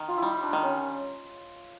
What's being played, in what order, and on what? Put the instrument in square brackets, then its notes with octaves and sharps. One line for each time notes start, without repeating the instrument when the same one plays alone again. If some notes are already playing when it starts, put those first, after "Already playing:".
Already playing: [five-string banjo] D#3
[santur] F4
E4
[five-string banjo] G3 [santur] D#4
[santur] D4
[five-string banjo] D#3
[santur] C#4